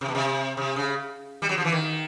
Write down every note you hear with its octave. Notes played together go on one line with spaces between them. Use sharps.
C3
B2
C3
C3
C#3
G3
F#3
F3
E3
D#3